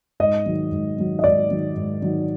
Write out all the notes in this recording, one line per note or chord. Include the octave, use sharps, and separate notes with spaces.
G#2 D#5
D#3 F#3
G#2
D#3 F#3
D#5
G#2 D5
D#3 F#3
G#2
D#3 F#3